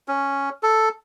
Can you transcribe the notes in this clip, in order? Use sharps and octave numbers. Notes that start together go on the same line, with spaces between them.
C#4
A4